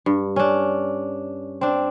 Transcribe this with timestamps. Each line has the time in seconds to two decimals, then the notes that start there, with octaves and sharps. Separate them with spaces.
0.06 G2
0.36 C#4 D4
1.61 C4 D4